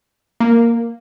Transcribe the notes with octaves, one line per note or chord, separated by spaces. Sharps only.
A#3